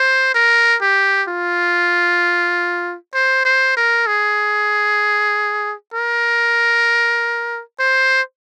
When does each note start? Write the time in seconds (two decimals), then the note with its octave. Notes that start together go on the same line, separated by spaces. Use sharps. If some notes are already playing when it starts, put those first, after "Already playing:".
Already playing: C5
0.34 A#4
0.81 G4
1.28 F4
3.14 C5
3.45 C5
3.76 A#4
4.07 G#4
5.94 A#4
7.79 C5